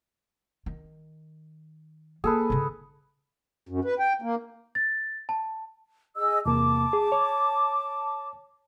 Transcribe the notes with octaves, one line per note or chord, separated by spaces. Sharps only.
D#3
A#3 G#4 A4 B4
G#2 C#3
F#2
B4
G5
A#3
A6
A5
G#4 D#5 E6
E2 C3 A#3 A5 D6
G#4
C#5